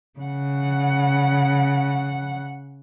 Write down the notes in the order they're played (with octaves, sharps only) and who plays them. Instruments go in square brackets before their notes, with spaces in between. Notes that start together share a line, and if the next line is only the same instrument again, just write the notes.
[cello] C#3 F#5